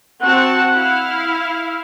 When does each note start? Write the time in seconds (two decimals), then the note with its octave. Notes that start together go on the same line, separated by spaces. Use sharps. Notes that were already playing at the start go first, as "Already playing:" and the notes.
0.22 C4 F#4 F#5 A5
0.74 E4 F5